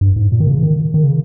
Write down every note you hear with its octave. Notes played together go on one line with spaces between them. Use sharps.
G2
G#2
A#2
D#3
C#3
D#3
D#3
C#3